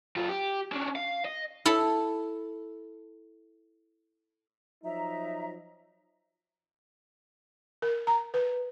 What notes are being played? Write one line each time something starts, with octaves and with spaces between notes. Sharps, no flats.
F#2 F4
G4
C#4 D4
F5
D#5
E4 A4
F3 F#3 D#4 E5 A#5
A#4
A#5
B4